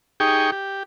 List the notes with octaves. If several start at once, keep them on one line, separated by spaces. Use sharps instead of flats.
D#4 G4 G#4 G5 C#6
G4